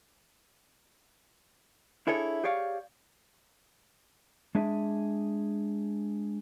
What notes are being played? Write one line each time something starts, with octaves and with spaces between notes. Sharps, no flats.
D4 E4 G#4 A4 C#5
G4 G#4 C#5 D5 F5
G#3 D4 G#4 E5